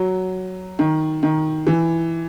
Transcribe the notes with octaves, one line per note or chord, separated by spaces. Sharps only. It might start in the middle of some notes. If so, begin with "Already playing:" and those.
Already playing: F#3
D#3
D#3
E3